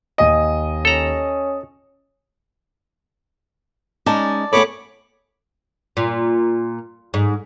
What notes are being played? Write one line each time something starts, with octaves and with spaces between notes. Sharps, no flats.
D#2 D#5 G#5 D#7
C#4 A4 A#5
G#3 C#4 D#4 D5 A5
A3 B3 G#4 A4 C#5 B5 D6
A#2
G#2